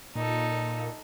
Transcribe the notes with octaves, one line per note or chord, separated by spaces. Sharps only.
A#2 D#4 A4